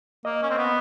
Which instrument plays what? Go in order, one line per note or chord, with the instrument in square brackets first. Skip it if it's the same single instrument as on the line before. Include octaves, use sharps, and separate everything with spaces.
[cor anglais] A#3 [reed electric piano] D#5
[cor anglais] C#4
C4
B3